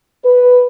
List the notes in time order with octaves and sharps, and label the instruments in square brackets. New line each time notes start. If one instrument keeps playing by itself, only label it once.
[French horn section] B4